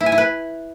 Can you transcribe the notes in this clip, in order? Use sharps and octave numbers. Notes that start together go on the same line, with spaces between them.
E4
G#5
E4
B4